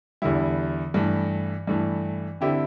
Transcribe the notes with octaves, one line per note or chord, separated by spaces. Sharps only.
E2 D3 G3 E4
G2 E3 A3
G2 E3 A3
D3 C4 E4 G4